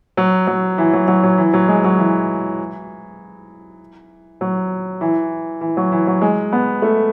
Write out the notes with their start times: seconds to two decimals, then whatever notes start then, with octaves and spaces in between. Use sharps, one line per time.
0.17 F#3
0.47 F#3
0.78 E3
0.93 F#3
1.08 F#3
1.23 F#3
1.38 E3
1.54 F#3
1.68 G#3
1.84 F#3
1.99 E3
4.41 F#3
5.01 E3
5.61 E3
5.77 F#3
5.92 E3
6.07 F#3
6.22 G#3
6.53 B3
6.82 A3